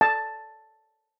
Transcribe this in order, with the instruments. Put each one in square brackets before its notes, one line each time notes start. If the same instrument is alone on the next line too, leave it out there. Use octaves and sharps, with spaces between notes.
[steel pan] A5